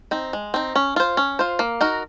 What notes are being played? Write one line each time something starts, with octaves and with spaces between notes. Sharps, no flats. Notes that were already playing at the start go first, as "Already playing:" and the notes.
C4 D#4
G#3
C4 D#4
C#4
F4 C5
C#4
F4 C5
A#3
D#4 F#4 A#4